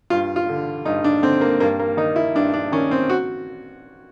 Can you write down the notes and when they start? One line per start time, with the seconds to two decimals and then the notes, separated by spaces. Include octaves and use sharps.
0.10 G2 F4
0.36 F4
0.49 D3
0.85 G2 D#4
1.04 D4
1.22 D3 C4
1.41 A#3
1.60 G2 A#3
1.80 A#3
1.97 D#3 D#4
2.16 E4
2.35 G2 D4
2.54 D4
2.72 D#3 C#4
2.91 C4
3.09 F#4